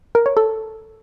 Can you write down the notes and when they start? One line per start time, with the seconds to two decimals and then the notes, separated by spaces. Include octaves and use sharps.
0.15 A#4
0.26 C#5
0.37 A4